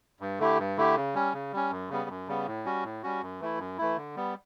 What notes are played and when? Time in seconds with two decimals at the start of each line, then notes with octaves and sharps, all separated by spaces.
0.20 G2
0.39 D3 A3 E4 G4
0.59 G2
0.78 D3 A3 E4 G4
0.96 C#3
1.14 G3 C#4
1.33 C#3
1.53 G3 C#4
1.71 F#2
1.90 C#3 G3 B3
2.09 F#2
2.28 C#3 G3 B3
2.47 A2
2.65 G3 C#4 F#4
2.83 A2
3.03 G3 C#4 F#4
3.22 F#2
3.40 E3 A3 E4
3.59 F#2
3.78 E3 A3 E4
3.97 D3
4.16 G3 B3